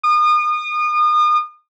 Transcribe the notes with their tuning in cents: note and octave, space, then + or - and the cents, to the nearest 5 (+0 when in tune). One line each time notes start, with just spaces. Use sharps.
D#6 -35